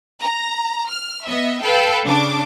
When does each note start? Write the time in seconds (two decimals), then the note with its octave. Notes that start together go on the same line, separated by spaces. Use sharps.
0.21 A#5
0.88 F6
1.24 B3 D#5 E5
1.61 A4 B4 F5 G5
2.06 C#3 D4 D6